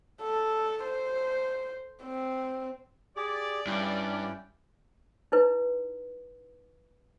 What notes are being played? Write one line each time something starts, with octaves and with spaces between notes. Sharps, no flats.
A4
C5
C4
G4 G#4 D5
G2 C#4 E4 G5
D#4 E4 B4